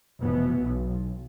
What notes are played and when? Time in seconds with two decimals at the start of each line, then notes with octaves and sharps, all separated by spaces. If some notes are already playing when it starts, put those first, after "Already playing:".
0.19 F1 B2 E3 B3
0.63 B1